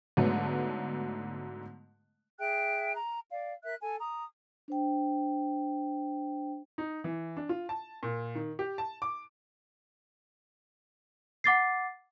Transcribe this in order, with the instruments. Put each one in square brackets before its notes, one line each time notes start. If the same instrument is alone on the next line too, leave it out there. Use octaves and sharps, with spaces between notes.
[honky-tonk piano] G#2 D3 F#3 A3 B3
[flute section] G#4 E5 G5 F#6
A#5
D5 F5
A#4 E5 F#6
A4 G#5
A#5 D#6
[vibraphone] D4 C5 G5
[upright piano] D#4
E3
D4
F4
A5
A#2
D#3
G4
A5
D6
[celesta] F#5 D6 A6 C7